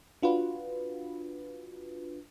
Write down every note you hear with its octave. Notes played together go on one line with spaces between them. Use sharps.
D4 F4 F#4 B4